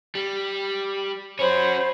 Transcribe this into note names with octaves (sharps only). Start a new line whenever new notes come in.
G3
C#4 F#4 C5 C#5 B5